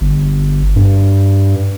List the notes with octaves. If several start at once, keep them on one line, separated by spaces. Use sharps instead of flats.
G1
G2